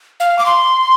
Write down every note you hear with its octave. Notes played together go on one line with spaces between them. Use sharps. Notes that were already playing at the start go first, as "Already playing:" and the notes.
F5
D6
C6